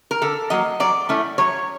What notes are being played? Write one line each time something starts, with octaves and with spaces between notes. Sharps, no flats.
A#4
D3 A4
F#3 A#3 D#5
F#3 D5
A3 C#4 E4
F#3 C#5